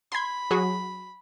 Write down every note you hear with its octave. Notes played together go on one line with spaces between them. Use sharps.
B5 C6 G#6
F#3 F#4 G#4